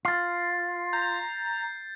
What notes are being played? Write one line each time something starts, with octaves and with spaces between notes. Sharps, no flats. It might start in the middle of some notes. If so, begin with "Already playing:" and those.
F4 A6 C7
A#5 G6